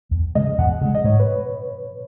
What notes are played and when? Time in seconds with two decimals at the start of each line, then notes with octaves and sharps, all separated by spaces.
0.11 E2
0.35 C#3 G#3 D#5
0.58 E2 F#5
0.81 C#3 G#3
0.95 D#5
1.04 G#2 C#5
1.20 B4